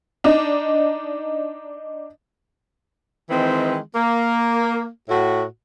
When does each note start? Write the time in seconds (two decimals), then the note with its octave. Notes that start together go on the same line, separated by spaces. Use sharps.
0.24 D4 D#4
3.30 D#3 E3 G#3 C4
3.95 A#3
5.09 A2 F#4